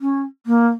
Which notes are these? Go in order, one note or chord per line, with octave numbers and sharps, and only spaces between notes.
C#4
A#3